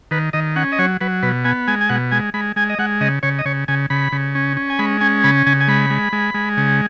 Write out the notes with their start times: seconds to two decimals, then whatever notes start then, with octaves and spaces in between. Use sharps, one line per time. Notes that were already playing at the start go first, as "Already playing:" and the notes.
0.11 D#3 B4
0.33 D#3 D#5
0.56 C#4 F#5
0.72 D#5
0.79 F#3 C#5
1.01 F#3 B4
1.23 B2 B4
1.45 B3 G#5
1.68 G#3 G#5
1.81 G#5
1.89 B2 F#5
2.11 G#3 G#5
2.34 G#3 B5
2.56 G#3 G#5
2.70 D#5
2.79 G#3 F#5
3.01 C#3 D#5
3.23 C#3 C#5
3.39 D#5
3.45 C#3 C#5
3.68 C#3 G#5
3.90 C#3 B5
4.12 C#3
4.35 C#4
4.57 C#4
4.70 G#5
4.79 G#3 B5
5.01 C#4 G#5
5.24 C#3 B5
5.46 C#3 G#5
5.60 G#5
5.68 G#3 B5
5.90 G#3
6.13 G#3
6.34 G#3
6.57 C#3